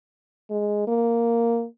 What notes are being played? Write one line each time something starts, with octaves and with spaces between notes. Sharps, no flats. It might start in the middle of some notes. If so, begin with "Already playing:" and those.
G#3
A#3